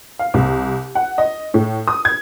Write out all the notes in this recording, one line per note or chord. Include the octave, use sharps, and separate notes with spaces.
F5
C2
F#5
D#5
A2
D#6
G#6